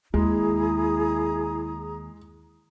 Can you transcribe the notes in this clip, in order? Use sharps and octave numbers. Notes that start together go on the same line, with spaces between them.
D#2 G#3 E4 G#4 A#5 D#6